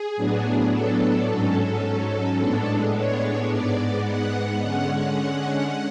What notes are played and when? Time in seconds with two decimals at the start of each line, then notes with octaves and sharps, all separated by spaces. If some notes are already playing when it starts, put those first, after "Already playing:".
Already playing: G#4
0.16 A2 F#3 B3 D4
0.72 A4
1.28 G#2 F#3 C#4 A4
2.39 A2 G#3 B3 D4
2.94 C#5
3.49 G#2 G#3 B3 D5
4.05 F#5
4.61 D3 G#3 C#4 F#5